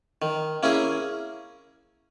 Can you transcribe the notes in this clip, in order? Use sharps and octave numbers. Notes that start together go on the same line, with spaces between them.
D#3
A#3 C#4 E4 G#4